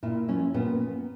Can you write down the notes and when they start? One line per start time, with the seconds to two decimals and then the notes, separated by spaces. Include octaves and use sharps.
0.03 A#2 E4
0.28 F3 C#4
0.54 A#2 B3